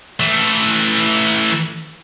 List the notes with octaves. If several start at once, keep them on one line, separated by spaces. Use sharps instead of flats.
E3 A3